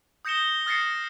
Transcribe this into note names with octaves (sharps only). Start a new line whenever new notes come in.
D#6 G6 A#6 C#7 E7 G7
D#6 F6 A6 A#6 C7 C#7